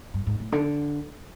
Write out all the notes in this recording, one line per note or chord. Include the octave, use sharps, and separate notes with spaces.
G2
G#2
A2
D3